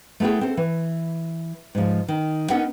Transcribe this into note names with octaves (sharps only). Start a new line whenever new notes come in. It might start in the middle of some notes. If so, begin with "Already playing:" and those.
A3 B3 E4 G#4 G5
C4 A4
E3
G#2 F3
D#3
B3 C#4 D#4 A#4 F#5 G5